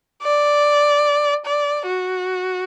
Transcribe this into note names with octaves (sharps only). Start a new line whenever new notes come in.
D5
D5
F#4